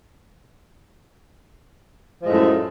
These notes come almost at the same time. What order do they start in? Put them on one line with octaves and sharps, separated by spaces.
F3 G#3 A2 F#2 A3